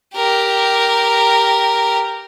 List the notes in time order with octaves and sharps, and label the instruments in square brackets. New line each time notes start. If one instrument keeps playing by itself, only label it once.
[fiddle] G4 A#4